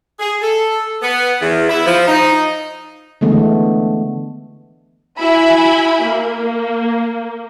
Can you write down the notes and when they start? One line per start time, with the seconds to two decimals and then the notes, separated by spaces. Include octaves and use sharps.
0.20 G#4
0.42 A4
1.02 B3
1.41 E2
1.69 E4
1.85 F3
2.07 D#4
3.21 D3 E3 G#3 A3 B3
5.19 E4 F#4 E5 G#5 B5
6.05 A#3